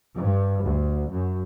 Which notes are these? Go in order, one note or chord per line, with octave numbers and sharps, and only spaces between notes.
G2
D2
F#2